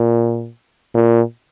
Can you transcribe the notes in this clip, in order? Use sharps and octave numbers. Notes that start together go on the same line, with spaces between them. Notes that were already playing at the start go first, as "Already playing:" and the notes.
Already playing: A#2
A#2